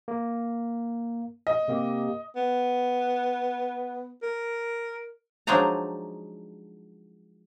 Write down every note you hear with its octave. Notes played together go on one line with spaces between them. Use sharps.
A#3
D#5
C3 A#3 G4
B3
A#4
F3 F#3 G#3 D4 D#4 A#5